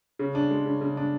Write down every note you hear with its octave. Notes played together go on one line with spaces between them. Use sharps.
C#3
D4
G#3
C#3
C#3
D4